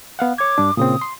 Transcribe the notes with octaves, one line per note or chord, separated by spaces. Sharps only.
B3 F5 F#5
C#5 D6 G#6
G2 D4
A#2 C#3 C4 D#6
C6